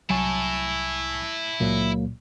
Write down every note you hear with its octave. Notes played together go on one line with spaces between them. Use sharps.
C2 F#3 E4 G#5 A5 C#6
C#2 A#2 F#3 A#3